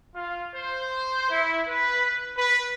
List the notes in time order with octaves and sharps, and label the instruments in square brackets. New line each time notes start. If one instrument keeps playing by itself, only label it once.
[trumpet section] F4
C5
E4
B4
B4